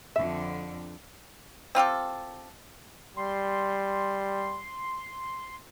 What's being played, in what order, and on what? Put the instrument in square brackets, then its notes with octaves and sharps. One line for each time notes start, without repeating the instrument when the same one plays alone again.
[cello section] F2 D3 [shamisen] E5
[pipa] C4 F4 G4 A4
[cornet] G3 [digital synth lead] C6